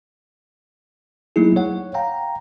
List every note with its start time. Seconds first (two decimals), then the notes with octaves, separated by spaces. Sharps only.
1.36 F#3 A3 A#3 D#4 E4 G#4
1.56 C#5 F#5
1.94 F5 G5 A#5